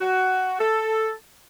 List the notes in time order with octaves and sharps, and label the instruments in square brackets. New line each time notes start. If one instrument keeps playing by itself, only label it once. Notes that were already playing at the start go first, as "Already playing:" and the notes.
[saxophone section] F#4
A4